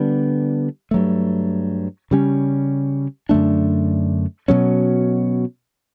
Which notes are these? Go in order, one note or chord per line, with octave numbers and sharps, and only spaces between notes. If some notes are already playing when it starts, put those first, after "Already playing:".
Already playing: D3 G3 B3 D4
G2 F#3 A3
C#3 G3 C#4
F#2 D3 A3 D4
B2 F#3 C#4